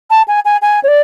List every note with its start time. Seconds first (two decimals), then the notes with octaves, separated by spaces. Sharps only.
0.10 A5
0.28 G#5
0.45 G#5
0.62 G#5
0.83 C#5
0.88 D5